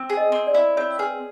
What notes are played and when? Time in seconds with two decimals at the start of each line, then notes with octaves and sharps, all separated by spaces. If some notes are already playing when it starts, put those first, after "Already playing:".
Already playing: C4
0.10 G#4
0.17 D#5
0.32 C4
0.47 D5
0.54 E4
0.77 C4 C#5
0.99 G#4 B4